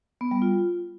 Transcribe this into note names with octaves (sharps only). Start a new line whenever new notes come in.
B3
G3
F4